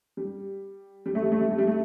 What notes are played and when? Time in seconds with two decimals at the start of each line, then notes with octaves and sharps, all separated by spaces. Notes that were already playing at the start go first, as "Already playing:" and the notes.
0.17 G3
1.06 G3
1.15 A3
1.23 G3
1.32 A3
1.41 G3
1.50 A3
1.58 G3
1.67 A3